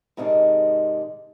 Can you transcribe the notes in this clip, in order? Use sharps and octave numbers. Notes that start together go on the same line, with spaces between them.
G#2 C3 D#3 G#3 C#4 D4